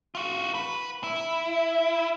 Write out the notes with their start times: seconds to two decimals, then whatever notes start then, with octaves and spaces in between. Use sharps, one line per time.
0.15 F4 F#4
0.54 B4
1.04 E4